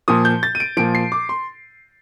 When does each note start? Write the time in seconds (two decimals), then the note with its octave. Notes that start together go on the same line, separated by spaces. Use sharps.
0.08 A#2 F3 D#6
0.25 G6
0.43 A6
0.55 D#7
0.60 D7
0.77 A#2 F3 D7
0.95 C7
1.12 D6
1.29 C6